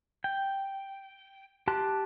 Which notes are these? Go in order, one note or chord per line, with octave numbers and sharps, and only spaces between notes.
G5
G4 A5 C6 F#6